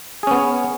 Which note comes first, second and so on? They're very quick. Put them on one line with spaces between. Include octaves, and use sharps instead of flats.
G#4 C#4 B3